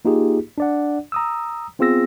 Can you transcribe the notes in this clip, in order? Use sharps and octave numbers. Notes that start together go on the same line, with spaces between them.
A#3 D#4 F4 G4 G#4
D4 D5 F#5
A#5 D#6 E6
B3 C4 F4 G#4 E6 A#6